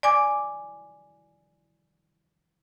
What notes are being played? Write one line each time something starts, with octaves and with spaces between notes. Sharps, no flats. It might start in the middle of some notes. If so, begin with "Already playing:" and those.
D5 G#5 D6